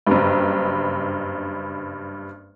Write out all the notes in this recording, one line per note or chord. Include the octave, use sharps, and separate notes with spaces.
F#1 G2